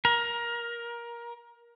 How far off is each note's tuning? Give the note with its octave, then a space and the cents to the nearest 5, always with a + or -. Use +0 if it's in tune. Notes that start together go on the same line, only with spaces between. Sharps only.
A#4 +20